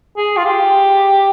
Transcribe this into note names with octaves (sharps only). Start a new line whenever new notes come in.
G#4
F4
G4